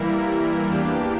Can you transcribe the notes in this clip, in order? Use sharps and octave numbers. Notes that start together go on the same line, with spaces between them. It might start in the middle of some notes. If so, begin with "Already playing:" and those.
Already playing: E3 G3 A#3 E4 A#4
E2 E3 A#3 D4 G4